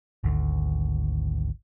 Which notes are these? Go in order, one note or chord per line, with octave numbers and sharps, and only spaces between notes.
G#1 D2